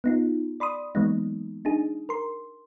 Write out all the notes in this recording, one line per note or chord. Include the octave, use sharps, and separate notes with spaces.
B3 D#4 F4
D5 B5 C6 D#6
E3 F#3 G#3 A#3 B3 D#4
D4 D#4 G#4
A#4 C6